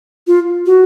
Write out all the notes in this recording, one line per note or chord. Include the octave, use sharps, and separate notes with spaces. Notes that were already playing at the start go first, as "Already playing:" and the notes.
F4
F#4